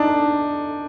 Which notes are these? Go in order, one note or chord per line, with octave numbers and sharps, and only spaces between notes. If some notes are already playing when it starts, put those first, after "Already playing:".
Already playing: D4 D#4